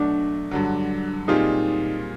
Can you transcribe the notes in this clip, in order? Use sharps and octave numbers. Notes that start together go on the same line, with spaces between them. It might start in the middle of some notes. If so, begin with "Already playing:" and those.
Already playing: B2 F#3 A3 D4
G2 D3 F#3
A#2 G3 C4 D#4 F4 G#4